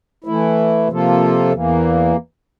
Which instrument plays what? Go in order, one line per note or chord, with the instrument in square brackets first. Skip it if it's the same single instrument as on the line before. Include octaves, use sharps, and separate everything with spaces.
[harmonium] E3 A3 E4
C3 F3 A#3 F4 A4
E2 E3 A#3